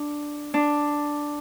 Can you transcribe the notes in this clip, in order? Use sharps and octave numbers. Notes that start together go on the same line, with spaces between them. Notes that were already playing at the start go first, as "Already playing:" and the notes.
Already playing: D4
D4